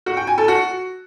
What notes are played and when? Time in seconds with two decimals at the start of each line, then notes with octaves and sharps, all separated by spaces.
0.06 F#4
0.17 G5
0.27 G#5
0.38 A4
0.48 F#4